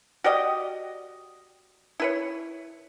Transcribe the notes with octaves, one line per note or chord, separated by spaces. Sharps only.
F#4 G4 D5 D#5
E4 B4 C#5